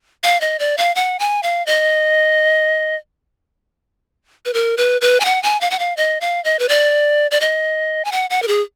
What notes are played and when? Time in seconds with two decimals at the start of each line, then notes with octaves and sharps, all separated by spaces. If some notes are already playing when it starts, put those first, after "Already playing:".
0.23 F5
0.41 D#5
0.59 D5
0.78 F5
0.95 F#5
1.19 G#5
1.43 F5
1.67 D#5
4.45 B4
4.54 A#4
4.77 B4
5.01 B4
5.20 G#5
5.25 F#5
5.43 G#5
5.61 F5
5.71 F#5
5.79 F5
5.97 D#5
6.21 F5
6.44 D#5
6.59 B4
6.69 D5
7.31 D5
7.41 D#5
8.05 G#5
8.12 F#5
8.30 F#5
8.42 A#4
8.48 G#4